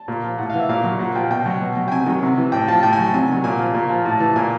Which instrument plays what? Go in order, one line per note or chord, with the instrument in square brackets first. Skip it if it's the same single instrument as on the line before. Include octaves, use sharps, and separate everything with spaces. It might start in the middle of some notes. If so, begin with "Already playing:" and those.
Already playing: [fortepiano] A5
A#2
F3
A2 F#5
F5
E3
E5
A#2 F5
F#3
A#2 F#5
F3 G5
B2 G5
F#3
B2
F#3
G5
C3 G#5
D#3 F#3
C3
E3
A2 G5
F3 A5
A2 G5
G#5
F#3
A5
C3 G#5
D#3 F#3
A#2 G#5
F3
A#2
F3
A2 A5
E3 A5
A#2 G#5